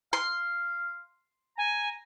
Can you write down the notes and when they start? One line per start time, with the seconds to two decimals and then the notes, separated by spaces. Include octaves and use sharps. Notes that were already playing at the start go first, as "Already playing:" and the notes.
0.13 F5 C6
1.57 G#5 A#5